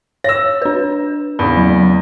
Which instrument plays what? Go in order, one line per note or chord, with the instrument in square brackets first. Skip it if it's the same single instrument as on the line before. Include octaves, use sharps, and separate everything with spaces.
[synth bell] C#5 [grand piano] E6 A#6
[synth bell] D4 B4
[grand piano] E2 C#3 [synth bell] B5
[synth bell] F#3